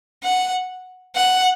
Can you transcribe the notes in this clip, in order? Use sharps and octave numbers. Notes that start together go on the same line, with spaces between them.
F#5
F#5